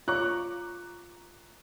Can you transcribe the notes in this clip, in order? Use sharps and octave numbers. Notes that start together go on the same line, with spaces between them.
F4 C#5 A#5 C#6 D6 F#6